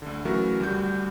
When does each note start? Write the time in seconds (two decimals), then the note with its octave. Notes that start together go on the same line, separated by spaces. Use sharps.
0.02 D2 D3
0.25 C#3 E3 F#3 A3 F#4 A#4
0.60 D2 G3 F#4 G6